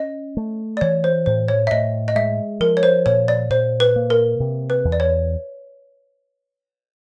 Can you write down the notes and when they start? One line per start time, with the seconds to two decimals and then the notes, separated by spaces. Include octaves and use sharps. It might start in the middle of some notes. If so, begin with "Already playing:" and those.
Already playing: C#4 D#5
0.37 A3
0.77 D5
0.81 E3 C#5
1.04 C5
1.26 A2 C5
1.48 C#5
1.67 E5
1.71 A2 D#5
2.08 D#5
2.15 G#3 E5
2.60 F3 A#4
2.77 C#5
2.83 C5
3.06 A#2 C#5
3.28 D5
3.50 A#2 C5
3.80 B4
3.96 A#3
4.10 A#4
4.40 C3
4.70 B4
4.85 E2
4.92 D5
5.00 C#5